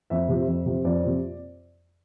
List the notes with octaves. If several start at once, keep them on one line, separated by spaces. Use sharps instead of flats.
F2 E5
C3 F3 C4
F2
C3 F3 C4
F2 D5
C3 F3 C4